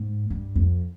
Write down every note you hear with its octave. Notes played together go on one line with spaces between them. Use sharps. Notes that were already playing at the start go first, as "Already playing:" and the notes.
Already playing: G#2
G2
F2